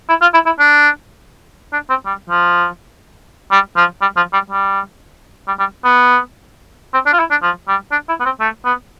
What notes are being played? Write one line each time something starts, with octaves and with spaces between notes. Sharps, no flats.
E4
F4
E4
E4
D4
D4
C4
G3
F3
G3
F3
G3
F3
G3
G3
G3
G3
B3
C4
D4
F4
E4
D4
F3
G3
D4
E4
B3
C4
A3
B3